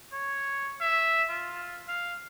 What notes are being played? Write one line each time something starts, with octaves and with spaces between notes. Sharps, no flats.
C#5
E5
F4
F5